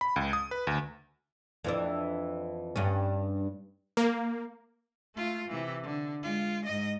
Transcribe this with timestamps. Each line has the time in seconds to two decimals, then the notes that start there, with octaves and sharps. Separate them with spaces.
0.01 B5
0.16 C#2
0.33 D#6
0.51 B4
0.67 D2
1.64 F2 E3 D4
2.76 G2 C#4
3.97 A#3
5.14 A3 F4
5.48 C3 E3
5.83 D3
6.23 G#3 F4
6.65 G#2 D#5